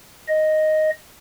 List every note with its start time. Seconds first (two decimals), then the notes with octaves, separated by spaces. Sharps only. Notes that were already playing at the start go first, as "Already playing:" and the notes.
0.28 D#5